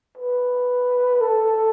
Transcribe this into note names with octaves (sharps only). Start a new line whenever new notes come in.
B4
A4